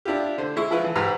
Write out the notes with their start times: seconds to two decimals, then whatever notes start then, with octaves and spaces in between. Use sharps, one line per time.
0.05 D4 E4 F4 G4
0.38 D3 C5
0.56 G#3 E4 C#6
0.71 F3 E4 F4 B4
0.84 E3
0.95 G#2 G4 B4 A#5 E6 F6